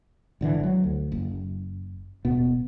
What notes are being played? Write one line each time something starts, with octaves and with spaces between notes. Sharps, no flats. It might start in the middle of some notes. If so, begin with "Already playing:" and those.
G#1 D3 E3
D#3 F#3
D2
F#1
D#1 B2 B3